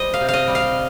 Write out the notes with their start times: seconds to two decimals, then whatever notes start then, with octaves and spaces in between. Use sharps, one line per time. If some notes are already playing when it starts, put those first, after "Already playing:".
Already playing: G3 C5 D#5
0.14 F5
0.21 C3
0.29 D#5 F5
0.47 G3
0.55 F5